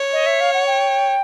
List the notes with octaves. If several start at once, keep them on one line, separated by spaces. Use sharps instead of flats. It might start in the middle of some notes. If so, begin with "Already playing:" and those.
Already playing: C#5
D#5
E5
F5
F#5
G5